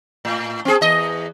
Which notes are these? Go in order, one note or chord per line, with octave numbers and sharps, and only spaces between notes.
A2
C4 G#4
E2 D#5